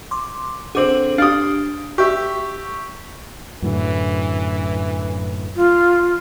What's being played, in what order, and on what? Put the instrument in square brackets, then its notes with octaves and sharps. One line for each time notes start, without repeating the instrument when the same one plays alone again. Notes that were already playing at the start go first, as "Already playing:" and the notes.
[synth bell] C6 D6
[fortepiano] D3 C4 [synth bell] G#4 D6 F#7
[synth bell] D4 G4 [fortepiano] F5 D#6
[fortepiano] G4 E5 [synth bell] C#6
[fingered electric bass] F#2 A2 D3 [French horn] E3
[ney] F4